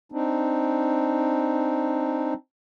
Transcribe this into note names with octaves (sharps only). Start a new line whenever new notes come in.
C4 D4 D#4